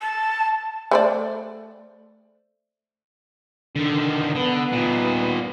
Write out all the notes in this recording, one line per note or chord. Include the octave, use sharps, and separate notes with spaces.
A5
A3 C5 D5
D3 D#3
D3 B3
A#2 D#3